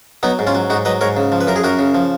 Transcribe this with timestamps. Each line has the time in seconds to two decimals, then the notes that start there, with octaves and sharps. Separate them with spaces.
0.23 F#3 B3 D#4
0.39 G#2
0.47 C#4 F4
0.55 F#3
0.70 G#2 D#4 F#4
0.85 F#3 B4 D#5
1.01 G#2 A#4 C#5
1.17 C#3
1.32 F3
1.41 B4
1.47 F#2 A#4
1.56 G#4
1.64 F#2 F#4 A#4
1.79 C#3
1.95 F3